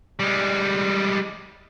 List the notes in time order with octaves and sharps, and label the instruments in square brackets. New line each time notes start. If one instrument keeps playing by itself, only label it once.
[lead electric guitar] G3 G#3